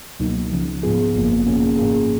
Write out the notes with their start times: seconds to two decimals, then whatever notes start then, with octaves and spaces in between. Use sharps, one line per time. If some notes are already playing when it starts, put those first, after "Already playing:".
0.19 C#2 B2 F#3 A#3 D#4
0.51 C#2 C#3 F3
0.83 G#2 F3 B3 F4 G#4
1.14 G#1 F#2 C#3 F3 A#3
1.46 B2 A#3 C#4 G#4
1.77 G#2 F3 A#3 F4 G#4